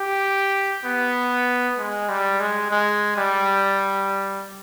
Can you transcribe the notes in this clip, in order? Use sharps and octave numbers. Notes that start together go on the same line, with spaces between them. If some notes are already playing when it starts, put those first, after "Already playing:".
Already playing: G4
B3
G#3
G3
G#3
G#3
G3